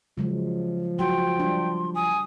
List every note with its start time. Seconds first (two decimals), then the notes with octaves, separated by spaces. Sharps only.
0.17 C#3 F3 F#3 G#3
0.99 F#3 F#4 G5 C6
1.40 G3 D4
1.95 G#5 D#6